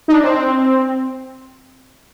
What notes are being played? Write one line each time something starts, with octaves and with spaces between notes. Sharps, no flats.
D#4
D4
C4